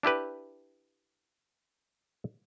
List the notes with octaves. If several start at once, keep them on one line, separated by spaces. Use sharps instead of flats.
D4 E4 G4 B4